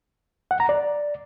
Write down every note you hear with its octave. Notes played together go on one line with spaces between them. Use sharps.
F#5
A#5
D5